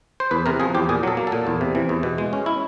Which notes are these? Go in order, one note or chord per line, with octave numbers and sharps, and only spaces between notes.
C5
E2 B4
C3 A#4
F3 G#4
E2 G4
A#2 G#4
F#3 A4
A#3
A4
A#2
E2
C3
E3
E2
B2
G#3
C#4
E4